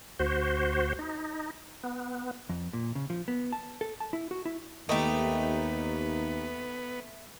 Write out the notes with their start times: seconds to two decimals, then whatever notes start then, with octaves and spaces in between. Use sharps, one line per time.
0.19 D2 F#4 C5
0.99 D#4
1.83 B3
2.49 F2
2.73 A#2
2.95 C#3
3.10 F3
3.28 B3
3.52 A5
3.81 A4
4.00 A5
4.13 E4
4.31 F#4
4.45 E4
4.89 D#2 A3 B3 D#4 G4